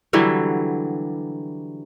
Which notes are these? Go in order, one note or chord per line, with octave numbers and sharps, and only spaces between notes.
D3 E3 F#3 G3